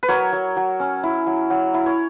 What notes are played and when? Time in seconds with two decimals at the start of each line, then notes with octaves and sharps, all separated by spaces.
0.03 B4
0.08 F#3 A#4 C#5
0.33 F#3
0.57 F#3
0.80 C#4
1.03 E4
1.27 F#3
1.50 F#3
1.74 E4
1.86 C#5